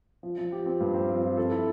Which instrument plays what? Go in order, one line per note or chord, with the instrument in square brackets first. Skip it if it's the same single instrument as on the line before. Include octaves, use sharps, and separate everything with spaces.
[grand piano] F3
F3
G4
C4
G2
C4
F3
F3
A4
E4